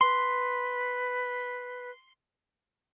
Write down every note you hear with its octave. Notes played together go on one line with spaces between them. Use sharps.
B4 C6